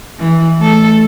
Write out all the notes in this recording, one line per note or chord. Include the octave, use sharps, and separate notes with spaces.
E3
A3 A4